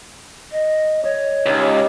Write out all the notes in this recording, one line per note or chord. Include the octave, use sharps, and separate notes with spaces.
D#5
C#5 D#5
C#2 D#4 G4